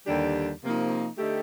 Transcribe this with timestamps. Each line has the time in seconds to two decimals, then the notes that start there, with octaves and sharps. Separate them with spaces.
0.06 D#2 D3 G3 D4 G4
0.62 C3 F3 A#3 D#4
1.18 D3 A3 D#4 G4